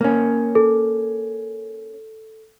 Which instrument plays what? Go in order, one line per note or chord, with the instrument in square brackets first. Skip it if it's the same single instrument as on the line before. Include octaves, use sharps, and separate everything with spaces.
[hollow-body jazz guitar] A#3 C#4
[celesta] A4